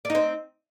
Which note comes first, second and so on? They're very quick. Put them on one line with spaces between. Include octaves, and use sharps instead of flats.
D5 D#4 C4